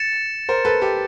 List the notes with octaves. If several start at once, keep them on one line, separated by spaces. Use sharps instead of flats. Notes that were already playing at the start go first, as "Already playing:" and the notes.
Already playing: A6 C#7 E7
A#4 C5
A4 B4
G4 A4